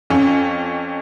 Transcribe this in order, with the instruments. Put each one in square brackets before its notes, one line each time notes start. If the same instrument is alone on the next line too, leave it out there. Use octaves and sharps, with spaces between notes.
[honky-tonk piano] F2 C#4